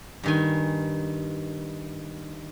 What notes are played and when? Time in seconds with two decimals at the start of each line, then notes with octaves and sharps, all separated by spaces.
0.23 G2 D#3 G#5